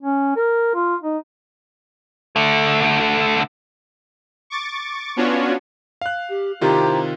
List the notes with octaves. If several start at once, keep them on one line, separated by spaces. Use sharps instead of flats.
C#4
A#4
F4
D#4
D3 A3
C#6 D6 A6
B3 C#4 D4 F4 F#4 C#5
F5 F#6
G4
C3 D#3 C4 E4 F4 G4 A#5